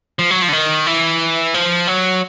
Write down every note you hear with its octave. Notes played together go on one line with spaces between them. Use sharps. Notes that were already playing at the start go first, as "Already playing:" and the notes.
F3
F#3
F3
D3
D#3
E3
F3
F#3